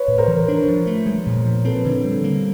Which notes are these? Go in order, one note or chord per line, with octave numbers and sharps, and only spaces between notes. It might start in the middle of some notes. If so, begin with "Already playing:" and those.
Already playing: B4 C#5
A2
A#4 C5
E3
D4
F3
A3
G#3
A#2
F3
C4 A4 B4
D3
G3
A#3